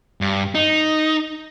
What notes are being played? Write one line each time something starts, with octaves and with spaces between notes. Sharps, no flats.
G2
D#4